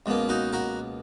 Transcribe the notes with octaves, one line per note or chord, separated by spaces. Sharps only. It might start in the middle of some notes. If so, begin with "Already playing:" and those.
C#2 B2 A#3
D#4 F#4
F#4 A#4